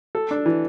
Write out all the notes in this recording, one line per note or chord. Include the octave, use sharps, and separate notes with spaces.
A4
D4
E3